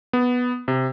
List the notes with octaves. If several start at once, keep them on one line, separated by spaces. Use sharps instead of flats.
B3
C3